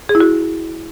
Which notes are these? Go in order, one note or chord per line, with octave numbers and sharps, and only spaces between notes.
G#4
E4
F#4